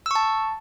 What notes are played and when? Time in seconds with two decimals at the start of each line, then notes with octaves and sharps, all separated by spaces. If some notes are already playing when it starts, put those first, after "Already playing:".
0.06 E6
0.11 C#6
0.15 A5